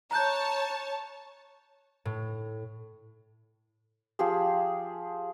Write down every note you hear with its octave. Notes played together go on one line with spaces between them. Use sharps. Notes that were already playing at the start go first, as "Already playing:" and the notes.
C#5 A5 A#5 F#6 G6
A2
F3 G4 G#4